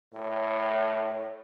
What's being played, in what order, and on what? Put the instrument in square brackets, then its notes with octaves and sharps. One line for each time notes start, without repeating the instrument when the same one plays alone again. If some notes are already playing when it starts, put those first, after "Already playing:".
[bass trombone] A2 [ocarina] C#5